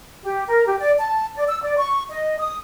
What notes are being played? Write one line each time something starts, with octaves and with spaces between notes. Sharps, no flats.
G4
A#4
G4
D5
A5
D5
E6
D5
C#6
D#5
D#6